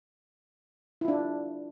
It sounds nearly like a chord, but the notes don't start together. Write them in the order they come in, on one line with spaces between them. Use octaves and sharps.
E4 F4 D4